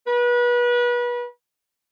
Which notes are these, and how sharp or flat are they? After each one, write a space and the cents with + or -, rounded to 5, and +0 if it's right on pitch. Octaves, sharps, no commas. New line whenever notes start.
B4 -30